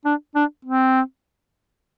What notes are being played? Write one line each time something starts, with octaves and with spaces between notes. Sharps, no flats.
D4
D4
C4